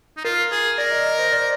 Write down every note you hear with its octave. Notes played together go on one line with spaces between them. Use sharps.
D#4
F4 A#4
G#4 A#4
A#4 D5
D#5
C5
D5